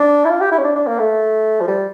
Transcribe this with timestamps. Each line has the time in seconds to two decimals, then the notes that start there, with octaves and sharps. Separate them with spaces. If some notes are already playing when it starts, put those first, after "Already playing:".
Already playing: D4
0.25 E4
0.30 F4
0.41 G4
0.52 E4
0.58 C#4
0.64 D4
0.75 D4
0.87 A#3
0.99 A3
1.61 F3
1.68 G3